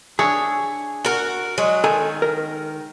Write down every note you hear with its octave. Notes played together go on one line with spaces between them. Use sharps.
D4 G#4 C#5 E5
F#4 A#4
F#3 G#3
D#3 A4 G#5
A#4